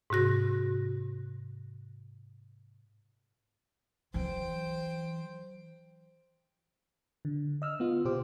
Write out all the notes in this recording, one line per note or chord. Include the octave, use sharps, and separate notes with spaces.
G#2 C3 F#4 A#6
E3 F#3 C5 G5
D3
D#5 E6 F6
B3 F4
B2 G4 C5 D6